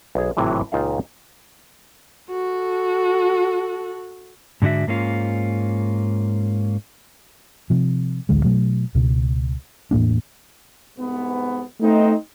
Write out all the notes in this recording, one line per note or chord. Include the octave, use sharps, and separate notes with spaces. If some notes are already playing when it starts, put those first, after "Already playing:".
B1 G#4
G#1 A2 C3 E3 F#3
C#2 A#2 D#4 F4 F5 F#5
F#4 A4
G#2 D3 D4 F#4 E5
G#2 A#3 C#4 F4
C3 F3
A1 D2 D3 G#3
B2 F#3 A3
C#2 B2
E2 A2 A#3 D4
C2 G#2 B3
A3 B3 C4 D#4